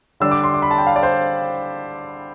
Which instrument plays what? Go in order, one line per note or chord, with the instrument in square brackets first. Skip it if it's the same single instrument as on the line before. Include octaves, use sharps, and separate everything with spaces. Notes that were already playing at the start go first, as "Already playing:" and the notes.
[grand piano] D3 G3 D4 E6
D6
C6
D6
B5
A5
G5
F5
D5
C5